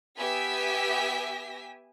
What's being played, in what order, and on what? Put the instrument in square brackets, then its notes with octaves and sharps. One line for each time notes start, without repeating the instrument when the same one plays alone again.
[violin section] B3 G4 E5 G#5 B6